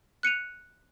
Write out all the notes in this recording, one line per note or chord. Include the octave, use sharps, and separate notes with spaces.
F#6 C#7 D#7 F7